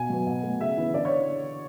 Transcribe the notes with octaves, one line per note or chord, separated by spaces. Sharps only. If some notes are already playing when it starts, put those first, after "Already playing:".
Already playing: B2 G#5
F#3 B3
B2
A3
C#3 E5
E3 B3
D3 D5
C#5